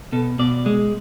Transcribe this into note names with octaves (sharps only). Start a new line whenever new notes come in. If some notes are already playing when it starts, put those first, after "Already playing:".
B2 A4
B2 D5
G#3